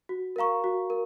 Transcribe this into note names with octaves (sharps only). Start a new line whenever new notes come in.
F#4
A#4 F5 A#5 C#6
F#4
A#4